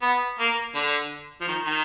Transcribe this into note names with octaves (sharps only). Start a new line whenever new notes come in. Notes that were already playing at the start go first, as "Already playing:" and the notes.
B3
A#3
D3
F3
D#3
D#3